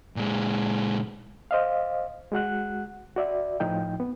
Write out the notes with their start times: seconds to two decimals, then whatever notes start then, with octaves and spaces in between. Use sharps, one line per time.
0.16 A#2 G#3
1.51 C5 D#5 F5
2.32 G#3 F#4 F#5 F#6
3.16 F#4 D5 E5
3.60 A2 F3 D#4 G5
4.00 B3